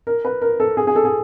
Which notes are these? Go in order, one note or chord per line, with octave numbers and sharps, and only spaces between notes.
A#4
B4
A#4
A4
G#4
G#4
A4
G#4